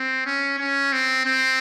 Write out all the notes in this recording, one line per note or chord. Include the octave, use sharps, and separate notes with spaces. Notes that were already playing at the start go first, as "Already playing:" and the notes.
Already playing: C4
C#4
C#4
C4
C4